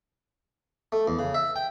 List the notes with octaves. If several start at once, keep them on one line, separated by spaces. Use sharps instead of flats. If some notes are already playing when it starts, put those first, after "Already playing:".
A3
E2
C#3
E5
G5